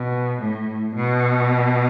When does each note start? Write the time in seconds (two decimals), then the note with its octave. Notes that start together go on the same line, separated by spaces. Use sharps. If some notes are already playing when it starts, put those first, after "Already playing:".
Already playing: B2
0.42 A2
0.95 B2